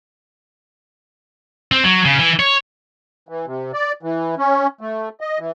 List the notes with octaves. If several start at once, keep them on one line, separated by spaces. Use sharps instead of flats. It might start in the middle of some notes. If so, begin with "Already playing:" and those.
C4
F#3
C#3
E3
C#5
E3
C3
D5
E3
C#4
A3
D#5
E3